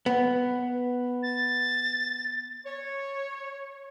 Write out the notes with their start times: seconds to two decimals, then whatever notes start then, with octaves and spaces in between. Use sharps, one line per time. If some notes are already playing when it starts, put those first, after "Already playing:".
0.06 B3
1.23 A6
2.65 C#5